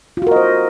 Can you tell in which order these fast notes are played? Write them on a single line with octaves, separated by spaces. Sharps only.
F4 F#4 A#4 D#5 C5